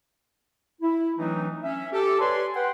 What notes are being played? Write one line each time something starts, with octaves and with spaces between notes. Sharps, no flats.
E4
E3 F#3 A3 C4 D4 D#4
C#4 E5
G4 A4
B4 C#5 D5 G#5 C6
B4 F#5 G5 C6